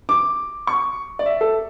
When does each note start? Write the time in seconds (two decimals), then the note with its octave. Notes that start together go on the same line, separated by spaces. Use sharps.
0.09 D6
0.67 C#6
1.19 D5
1.26 E5
1.41 A4